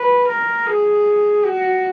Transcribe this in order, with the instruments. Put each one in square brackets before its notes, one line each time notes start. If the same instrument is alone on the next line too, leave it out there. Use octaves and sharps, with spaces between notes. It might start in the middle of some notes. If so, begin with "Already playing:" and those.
Already playing: [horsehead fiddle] B4
A#4
G#4
F#4